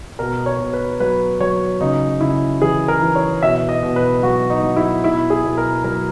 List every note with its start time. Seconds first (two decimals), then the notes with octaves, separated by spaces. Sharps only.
0.19 B2 A#4
0.46 C#5
0.60 B2
0.73 B4
1.00 F#3 B4
1.40 F#3 C#5
1.81 C#3 D#4
2.21 C#3 E4
2.62 E3 G#4
2.88 A#4
3.02 E3
3.15 C#5
3.42 B2 E5
3.69 D#5
3.83 B2
3.96 B4
4.23 F#3 F#4
4.50 D#4
4.63 F#3
4.76 E4
5.04 B2 E4
5.30 G#4
5.44 B2
5.57 A#4
5.84 F#3 A#4